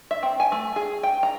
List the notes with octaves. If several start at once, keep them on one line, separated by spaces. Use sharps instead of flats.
E5
C4
G#5
A3
G#4
G5
A#5